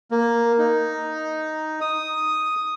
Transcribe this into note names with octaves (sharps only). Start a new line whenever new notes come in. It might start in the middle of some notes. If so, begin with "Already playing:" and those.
A#3
D#4
D#6